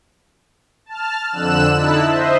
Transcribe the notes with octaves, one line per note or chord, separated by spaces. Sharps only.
A5 F6
F2 D3 E6 F#6 E7
D3 D#4 E4 A5 E6 F#6
C5 D#5 E5